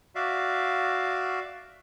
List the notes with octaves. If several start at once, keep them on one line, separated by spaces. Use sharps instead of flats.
F#4 D5 E5 F5